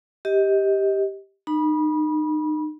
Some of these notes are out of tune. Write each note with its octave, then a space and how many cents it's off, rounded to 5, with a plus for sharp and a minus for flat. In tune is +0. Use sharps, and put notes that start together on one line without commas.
G4 +0 D#5 +25
D#4 -30 B5 -30